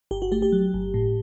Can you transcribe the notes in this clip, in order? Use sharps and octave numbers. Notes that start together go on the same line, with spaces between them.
G1 G4
F#4
A3 G4
G4
F#3
G1
A2